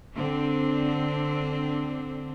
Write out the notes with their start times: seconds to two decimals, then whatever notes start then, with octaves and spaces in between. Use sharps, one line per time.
0.16 D3 C4 D4